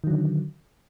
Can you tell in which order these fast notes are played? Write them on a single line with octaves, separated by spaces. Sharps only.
D#3 F#3 D3